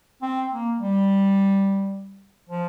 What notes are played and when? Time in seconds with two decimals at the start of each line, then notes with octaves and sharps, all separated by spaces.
0.22 C4
0.51 A#3
0.79 G3
2.49 F3